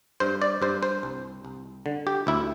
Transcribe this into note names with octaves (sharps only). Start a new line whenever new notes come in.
G2 C5
D5
G2 C5
C5
C2
C2
D3
G4
D2 E4